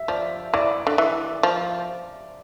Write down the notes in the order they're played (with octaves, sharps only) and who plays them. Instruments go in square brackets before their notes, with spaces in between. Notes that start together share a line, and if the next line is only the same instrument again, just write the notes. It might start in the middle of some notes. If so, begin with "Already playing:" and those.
Already playing: [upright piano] E5
[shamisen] F3 [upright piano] D5
[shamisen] E3 [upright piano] D5
[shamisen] D3
E3
F3